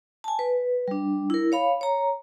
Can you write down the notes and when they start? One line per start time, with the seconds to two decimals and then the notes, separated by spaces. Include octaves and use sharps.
0.24 G#5 A5
0.39 B4
0.88 G3 D4
1.30 E4 A#4
1.52 C#5 F5 B5
1.81 C#5 A#5